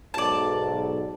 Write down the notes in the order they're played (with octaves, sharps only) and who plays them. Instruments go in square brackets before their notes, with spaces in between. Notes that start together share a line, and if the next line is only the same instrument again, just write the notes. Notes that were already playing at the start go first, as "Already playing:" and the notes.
[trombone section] B1 G#2 [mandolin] D5 A5